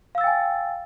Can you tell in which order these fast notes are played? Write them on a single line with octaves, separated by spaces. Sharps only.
F5 E6 A6 G5 G#5